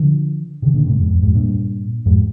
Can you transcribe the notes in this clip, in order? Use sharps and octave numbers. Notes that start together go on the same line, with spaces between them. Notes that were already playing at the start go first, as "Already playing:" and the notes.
Already playing: D3 F3
C3 D#3
A#2 D3
G#2 C3
F2 G#2
F2
F2 G#2
G2 A#2
F2 G#2